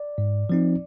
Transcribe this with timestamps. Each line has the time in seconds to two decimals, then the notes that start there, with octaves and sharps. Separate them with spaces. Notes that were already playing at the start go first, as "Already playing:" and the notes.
Already playing: D5
0.18 G#2
0.49 F3 C4 D#4